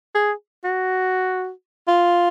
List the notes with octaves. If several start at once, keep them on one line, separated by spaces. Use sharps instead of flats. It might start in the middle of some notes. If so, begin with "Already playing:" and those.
G#4
F#4
F4